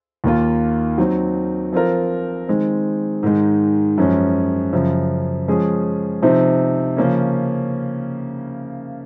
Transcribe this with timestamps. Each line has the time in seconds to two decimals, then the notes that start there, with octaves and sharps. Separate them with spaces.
0.24 D#2 D#3 A#3 F4
0.98 F#3 C4 D#4
1.73 F3 C4 F4 A#4
2.48 D#3 G#3 C4
3.23 G#2 D#3 G#3
3.98 F#2 F3 G#3 C#4
4.73 F#2 C#3 F3
5.48 F3 G#3 C#4 G#4
6.23 C3 F3 C4 D#4
6.97 C#3 F3 A#3 C#4